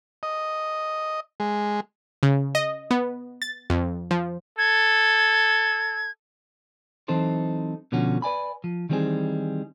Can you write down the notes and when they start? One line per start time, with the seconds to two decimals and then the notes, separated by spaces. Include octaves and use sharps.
0.23 D#5
1.40 G#3
2.23 C#3
2.55 D#5
2.91 B3
3.42 A6
3.70 F2
4.11 F3
4.58 A4 G#6
7.08 E3 F#3 C4 D#4 A4 C5
7.92 B2 D3 F3 C#4 F#4
8.22 B4 D5 G#5 B5
8.64 F3
8.89 D#3 E3 G3 C4 D#4 G#4